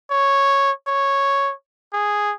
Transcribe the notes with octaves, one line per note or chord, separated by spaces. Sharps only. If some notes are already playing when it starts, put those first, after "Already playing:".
C#5
C#5
G#4